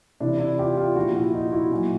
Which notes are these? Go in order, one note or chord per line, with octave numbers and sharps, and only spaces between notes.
C3 E3 D4 E4
D4 E4
F4 G4
F4 G4
A#2 F3 E4 F#4
E4 F#4
D#4 F4
E4 F#4
A#2 F#3